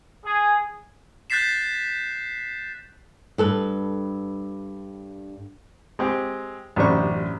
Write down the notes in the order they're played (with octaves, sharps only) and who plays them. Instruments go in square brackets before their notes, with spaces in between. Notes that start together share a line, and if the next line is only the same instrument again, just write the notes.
[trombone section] G#4
[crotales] F#6 G6 A6 B6 C7 E7
[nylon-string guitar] G2 A4 B4
[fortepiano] G#3 C4 G4
A1 F#2 C3 D4 C5 C#6